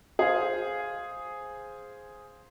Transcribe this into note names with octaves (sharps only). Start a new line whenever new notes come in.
G#4 C5 F5